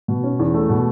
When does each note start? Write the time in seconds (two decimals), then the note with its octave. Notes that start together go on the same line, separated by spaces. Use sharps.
0.08 B2
0.23 C#4
0.39 E2
0.54 A3
0.69 B2